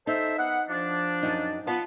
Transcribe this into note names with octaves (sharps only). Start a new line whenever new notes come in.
D#4 A4 C5 E5
B3 F#5
F3 D4
F#2 D#4
B3 F4 F5 A5